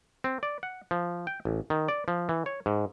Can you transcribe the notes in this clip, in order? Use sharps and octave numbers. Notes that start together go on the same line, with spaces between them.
C4
D5
F#5
F3
G5
A1
D#3
D5
F3
E3
C#5
G#2